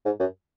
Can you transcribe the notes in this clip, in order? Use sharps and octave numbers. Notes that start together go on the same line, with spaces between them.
G#2
F#2